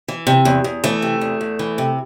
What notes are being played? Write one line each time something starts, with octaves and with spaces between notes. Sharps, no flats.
E3
C3
E2
E2
E3 A3
C3
E2
E2
E3
C3